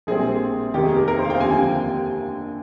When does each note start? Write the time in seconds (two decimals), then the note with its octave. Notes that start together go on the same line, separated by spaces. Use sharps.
0.07 A#1 A#2 G3 C4 G#4
0.74 F1 D#2 D#3 G4
0.85 G#4
0.96 A#4
1.08 A#4
1.19 C5
1.25 F5
1.30 G5
1.40 D#2 D3 F3 C4 G#5
1.51 G5